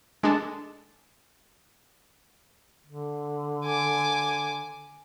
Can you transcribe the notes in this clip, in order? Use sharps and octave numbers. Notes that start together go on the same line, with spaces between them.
G#3 D4 A4
D3
G#5 D6